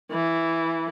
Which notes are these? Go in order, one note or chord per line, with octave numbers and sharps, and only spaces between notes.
E3